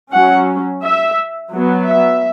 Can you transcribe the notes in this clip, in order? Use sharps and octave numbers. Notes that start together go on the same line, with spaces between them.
F#3 C#4 F#5
E5
F#3 B3
E5